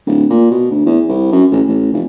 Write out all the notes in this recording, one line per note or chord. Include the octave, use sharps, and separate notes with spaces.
D1
A#2
B2
D2
E2
C2
F#2
A1
A1
F1